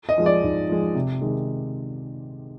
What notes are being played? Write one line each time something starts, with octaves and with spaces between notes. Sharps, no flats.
D#5
F3 G#3
D5
G#2
F3 G#3
C3
D#3 G#3